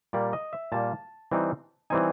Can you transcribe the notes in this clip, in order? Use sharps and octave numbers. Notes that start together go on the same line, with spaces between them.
A#2 G3 A#3 D5
D#5
E5
A#2 G3 A#3 A5
E3 G3 C4 D#4
E3 G3 C4 D#4 G#5